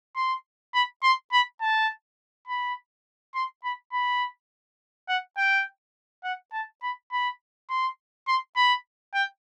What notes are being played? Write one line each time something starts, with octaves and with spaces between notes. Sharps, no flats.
C6
B5
C6
B5
A5
B5
C6
B5
B5
F#5
G5
F#5
A5
B5
B5
C6
C6
B5
G5